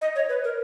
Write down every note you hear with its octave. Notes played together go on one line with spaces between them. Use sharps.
D#5
C#5
B4
A#4